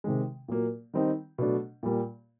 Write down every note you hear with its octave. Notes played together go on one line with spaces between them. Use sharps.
C3 D#3 G#3
A#2 F#3 A#3
D#3 G3 C4 D#4
B2 F#3 A3 D4
A#2 G3 A#3